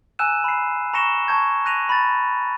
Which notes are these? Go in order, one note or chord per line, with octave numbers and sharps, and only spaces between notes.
G#5 A#5 E6 F#6 D#7 E7
B5 C7
A#5 C#6 A#6 C#7 E7 G7
A5 C#6 G6 G#6
F#6 A#6 D#7 F7
B5 A6